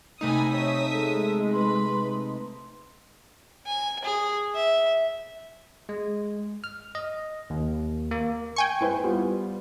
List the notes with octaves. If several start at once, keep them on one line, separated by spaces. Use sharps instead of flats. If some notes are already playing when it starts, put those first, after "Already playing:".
C3 A3 D#4 G#5 B5 D#6
C#5 E5 D#6 B6
G#3 A4
B4 B5 C6
G#5
G#4
E5
G#3
F6
D#5
D#2
A#3
G5 G#5 C#6
E4 B4 C5
G3 B3 F4